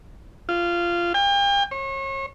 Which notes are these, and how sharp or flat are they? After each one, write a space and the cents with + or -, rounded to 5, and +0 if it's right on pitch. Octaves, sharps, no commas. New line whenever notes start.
F4 -15
G5 +40
C#5 -35